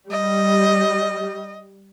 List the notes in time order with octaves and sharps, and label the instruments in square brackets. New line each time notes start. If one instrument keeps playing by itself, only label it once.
[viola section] G3 [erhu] D#5